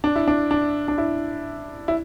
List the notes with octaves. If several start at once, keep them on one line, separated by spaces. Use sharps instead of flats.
D4
E4
D4
D4
D4
E4
E4